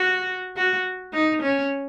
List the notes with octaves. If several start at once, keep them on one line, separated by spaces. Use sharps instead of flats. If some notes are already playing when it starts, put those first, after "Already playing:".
Already playing: F#4
F#4
D#4
C#4